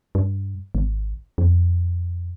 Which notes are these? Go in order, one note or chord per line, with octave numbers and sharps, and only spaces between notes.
G2
G#1
F2